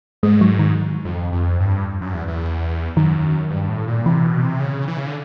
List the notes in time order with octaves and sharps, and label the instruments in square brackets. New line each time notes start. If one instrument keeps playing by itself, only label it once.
[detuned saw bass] G#2 [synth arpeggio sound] G#3
[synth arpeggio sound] F#3
D#3
[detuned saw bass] F2
F2
G2
F#2
E2
E2
[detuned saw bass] F#2 [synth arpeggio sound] D#3
[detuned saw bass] G2
A2
A#2
[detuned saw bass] C3 [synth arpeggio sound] E3
[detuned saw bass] B2
C3
C#3
E3
C#3
D3